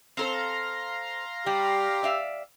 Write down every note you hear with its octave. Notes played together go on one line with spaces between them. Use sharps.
C4 A4 C5 F5 A#5 C6
G3 G4
D5 E5 F5